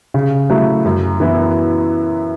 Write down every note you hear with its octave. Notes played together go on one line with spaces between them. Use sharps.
C#3
F#3 A3 E4
F#2
E3 B3 E4